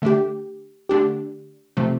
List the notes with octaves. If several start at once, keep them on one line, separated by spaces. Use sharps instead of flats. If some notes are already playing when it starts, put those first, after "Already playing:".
D3 A3 D4 G4
D3 A3 D4 G4
C3 F3 A3 C4